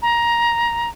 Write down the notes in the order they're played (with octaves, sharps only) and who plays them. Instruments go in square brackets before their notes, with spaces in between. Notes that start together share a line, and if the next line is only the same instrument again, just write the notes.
[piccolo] A#5